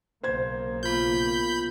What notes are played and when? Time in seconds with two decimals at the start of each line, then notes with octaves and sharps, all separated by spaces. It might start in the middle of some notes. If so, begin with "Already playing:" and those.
0.23 B1 C#3 A#3 C5 G#6
0.83 B3 F4 B5 G6